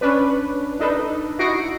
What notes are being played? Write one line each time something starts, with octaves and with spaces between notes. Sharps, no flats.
C#4 D4 B4
D4 D#4 A4 B4
D#4 E4 F#4 A#6 C7 D7